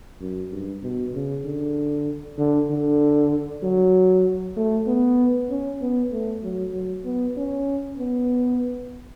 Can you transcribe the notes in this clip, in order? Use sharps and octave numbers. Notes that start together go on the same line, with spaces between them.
F#2
G2
B2
C#3
D3
D3
D3
F#3
A3
B3
C#4
B3
A3
F#3
F#3
B3
C#4
B3